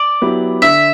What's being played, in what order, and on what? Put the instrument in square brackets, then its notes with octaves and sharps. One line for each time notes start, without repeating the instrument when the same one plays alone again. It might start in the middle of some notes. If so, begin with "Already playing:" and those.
Already playing: [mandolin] D5
[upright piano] F#3 B3 E4 G4
[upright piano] D3 [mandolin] E5